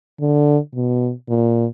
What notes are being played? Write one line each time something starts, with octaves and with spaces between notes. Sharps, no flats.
D3
B2
A#2